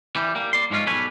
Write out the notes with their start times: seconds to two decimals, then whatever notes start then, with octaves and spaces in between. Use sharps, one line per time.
0.16 E3 G3
0.35 G3 A#3
0.53 D5 C6
0.70 G#2 F3 G#3 C#4 F4
0.86 B1 G3 A4 B4 C#5 G#5